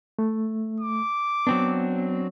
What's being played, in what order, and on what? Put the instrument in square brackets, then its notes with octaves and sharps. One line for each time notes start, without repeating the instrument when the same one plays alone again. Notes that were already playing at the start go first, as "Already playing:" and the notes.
[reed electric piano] A3
[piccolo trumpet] D6
[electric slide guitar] F#3 C4 D4 [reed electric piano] B3